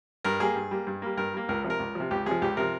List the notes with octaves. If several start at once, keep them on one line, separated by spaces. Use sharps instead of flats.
G2 A#4
G3 A#3 G#4
G2
G3 A#3
G2
G3 A#3
G2 A#4
G3 A#3
C#2 A#4
C3 F3
A#4
C#2
C3 F3
C#2 G4
C3 F3 G#4
C#2 G4
C3 F3 A#4